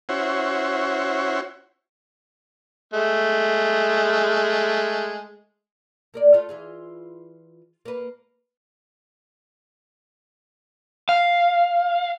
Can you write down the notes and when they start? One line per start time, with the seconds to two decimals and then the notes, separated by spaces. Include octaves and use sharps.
0.09 C#4 E4 F#4 C5
2.93 G#3 A3
6.14 A#3 A#4 D5
6.33 A3 F4
6.49 E3 F4 G#4
7.85 A#3 B4
11.09 F5